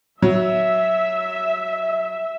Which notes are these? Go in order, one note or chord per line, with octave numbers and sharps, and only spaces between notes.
F#3 E5